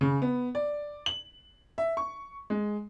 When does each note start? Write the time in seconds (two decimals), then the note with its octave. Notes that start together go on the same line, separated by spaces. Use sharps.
0.01 C#3
0.22 B3
0.55 D5
1.06 F#7
1.78 E5
1.97 C#6
2.50 G#3